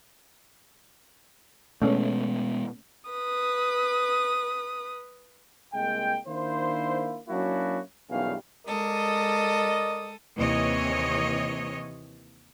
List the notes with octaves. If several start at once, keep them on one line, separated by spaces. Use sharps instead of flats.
B2 G#3 A3 B3 C#4
B4 D#6
C2 G#3 A#3 G5
D#3 A#3 D4 E4 C5
F#3 A#3 C#4 D4 E4 F#4
B1 E2 G2 D#3 C#4 F5
G#3 A4 A#4 D5 D#5 D#6
D#2 C3 E3 C#5 D#5